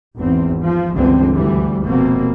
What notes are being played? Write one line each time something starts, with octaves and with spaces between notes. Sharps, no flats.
G#1 E2 C4
F3
G1 C#2 D3 E3 C4
D2 E3 G3
F1 B2 A#3 C4